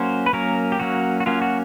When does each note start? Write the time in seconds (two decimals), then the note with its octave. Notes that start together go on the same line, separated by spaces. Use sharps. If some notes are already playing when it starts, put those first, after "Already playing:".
Already playing: F#3 A#3 C#4 C5
0.26 B4
0.33 F#3 A#3 C#4 A#4
0.72 G4
0.79 F#3 A#3 C#4 F#4
1.20 F#4
1.26 F#3 A#3 C#4 F4
1.42 F#4